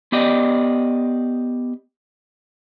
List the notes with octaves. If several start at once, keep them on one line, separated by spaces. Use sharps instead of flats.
B3 G4 D5 D#5